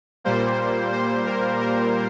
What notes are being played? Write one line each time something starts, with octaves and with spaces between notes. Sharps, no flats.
A#2 G3 A#3 C5
C5
A#4
A#4